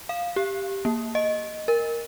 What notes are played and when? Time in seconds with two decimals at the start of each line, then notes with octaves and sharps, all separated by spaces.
0.09 F5
0.36 G4
0.85 A#3
1.15 D#5
1.68 A#4